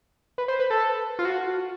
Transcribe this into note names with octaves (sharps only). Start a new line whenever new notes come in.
B4
C5
B4
A4
F4
F#4